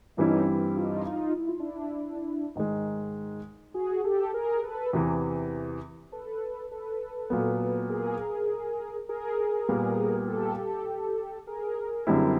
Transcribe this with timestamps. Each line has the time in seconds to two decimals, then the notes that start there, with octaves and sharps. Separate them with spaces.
0.17 G2 E3 G3 C4 C#4 D#4 E4
0.76 D#4 F4
1.06 D#4 F4
1.37 E4
1.49 F4
1.59 D4 E4
2.56 G#2 D#3 G#3
3.74 F#4 G#4
4.04 G4 A4
4.33 G#4 A#4
4.63 A4 B4
4.93 E2 C3 E3
6.12 A4 B4
6.71 A4 B4
7.30 A#2 F#3 B3
7.90 G#4 A#4
9.09 G#4 A#4
9.69 A#2 G3 B3
10.27 G4 A4
10.58 G4 A4
11.47 G#4 A#4
12.07 F#2 D3 G3 C4 E4